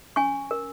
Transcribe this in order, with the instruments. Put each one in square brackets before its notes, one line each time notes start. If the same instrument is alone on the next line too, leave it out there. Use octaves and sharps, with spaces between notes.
[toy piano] C#4 G#5 C#6
A#4